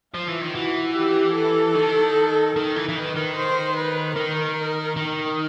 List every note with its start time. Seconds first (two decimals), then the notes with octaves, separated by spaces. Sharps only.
0.14 F3 F4
0.28 E3
0.41 D#3
0.55 E3 F#4
0.96 G4
1.35 A4
1.75 D#3
2.56 D#3 A#4
2.76 E3
2.89 E3
2.96 D#3 B4
3.16 D#3
3.36 C5
3.77 B4
4.16 D#3 A#4
4.96 D#3